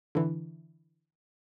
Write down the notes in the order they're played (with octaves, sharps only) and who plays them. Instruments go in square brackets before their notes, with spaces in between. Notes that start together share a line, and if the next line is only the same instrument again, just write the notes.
[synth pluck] D3 E3